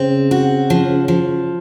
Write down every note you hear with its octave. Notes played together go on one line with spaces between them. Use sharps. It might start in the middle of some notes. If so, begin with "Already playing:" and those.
Already playing: C#3 C4
F#4
F3
F3